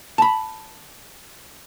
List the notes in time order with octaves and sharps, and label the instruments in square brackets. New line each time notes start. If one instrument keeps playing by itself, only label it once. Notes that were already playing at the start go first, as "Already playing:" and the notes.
[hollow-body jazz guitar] A5 B5